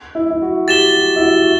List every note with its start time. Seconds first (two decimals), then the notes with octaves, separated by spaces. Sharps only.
0.15 E4
0.31 E4
0.42 F#4
0.68 G4 A6 E7 G7
0.94 F#4
1.16 E4
1.21 F#4
1.36 F#4